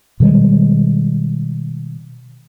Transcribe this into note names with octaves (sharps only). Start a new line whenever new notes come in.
B2 D#3 G3 G#3